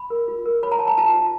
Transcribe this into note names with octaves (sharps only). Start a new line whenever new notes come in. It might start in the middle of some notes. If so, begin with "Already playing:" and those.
Already playing: B5
A#4
F4
A#4
C#5 B5
A#5
C#5 A5
A#5
F4 A5
F4